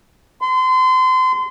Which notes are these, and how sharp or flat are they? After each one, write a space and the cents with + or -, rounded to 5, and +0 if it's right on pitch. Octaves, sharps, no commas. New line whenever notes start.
C6 -30